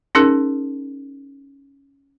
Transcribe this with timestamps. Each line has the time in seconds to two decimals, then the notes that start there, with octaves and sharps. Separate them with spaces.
0.15 C#4 D#4 G#4 A#4